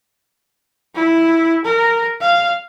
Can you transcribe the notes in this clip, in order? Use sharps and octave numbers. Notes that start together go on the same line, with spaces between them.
E4
A#4
F5